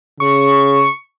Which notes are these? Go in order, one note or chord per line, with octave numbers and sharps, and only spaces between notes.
C#3 C#6